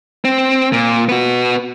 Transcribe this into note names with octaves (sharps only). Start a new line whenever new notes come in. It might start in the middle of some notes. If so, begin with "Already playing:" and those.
C4
A#2
B3 F#4